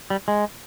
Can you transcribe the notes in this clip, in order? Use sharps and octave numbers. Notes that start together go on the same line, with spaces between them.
G3
G#3